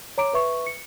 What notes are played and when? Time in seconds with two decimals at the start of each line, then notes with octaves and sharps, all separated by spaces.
0.18 C#5 A#5 D6 D7
0.33 B4 E5 C#6
0.67 C#7